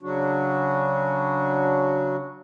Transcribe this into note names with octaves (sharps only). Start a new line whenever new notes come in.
C#3 F#3 D4 F#4